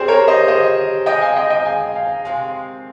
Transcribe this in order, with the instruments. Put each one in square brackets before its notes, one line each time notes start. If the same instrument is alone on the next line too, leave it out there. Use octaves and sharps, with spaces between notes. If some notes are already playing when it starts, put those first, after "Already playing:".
Already playing: [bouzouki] A#2 G3 C4 G4 [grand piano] G#4 C5
[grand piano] A#4 C#5
C5 D#5
C5 D#5
[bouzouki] G#3 C4 D#4 G#4 [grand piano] D#5 G5
[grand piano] F5 G#5
D#5 G5
D#5 G5
F5 G#5
F5 G#5
[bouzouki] C3 D#3 G#3 C4 [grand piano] F5 G#5